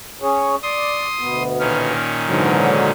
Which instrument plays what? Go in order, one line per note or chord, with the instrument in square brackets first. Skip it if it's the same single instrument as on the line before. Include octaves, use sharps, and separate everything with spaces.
[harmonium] C#4 G#4 C#5
[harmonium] D5 [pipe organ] C6 D#6
[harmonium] D2 B2 B3
[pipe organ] A#2 D#3 C#4 [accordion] F6
[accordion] G#2 D3 F#3 [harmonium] E3